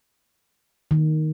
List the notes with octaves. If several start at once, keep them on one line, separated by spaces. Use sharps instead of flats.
D#3